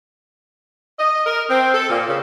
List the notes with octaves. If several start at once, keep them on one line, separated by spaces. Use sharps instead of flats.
D#5
A#4
C4
A4
A#2
C#3